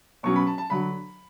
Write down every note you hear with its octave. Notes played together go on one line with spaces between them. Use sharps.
B2 F#3 C#4 C#6
B5
A5
A5
D3 F#3 B5